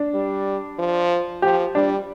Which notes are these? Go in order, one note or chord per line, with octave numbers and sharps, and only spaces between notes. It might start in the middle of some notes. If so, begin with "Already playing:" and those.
Already playing: D4
G3
F3
F3 G4
G3 D4